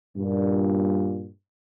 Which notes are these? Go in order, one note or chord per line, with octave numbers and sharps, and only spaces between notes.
G2 A#2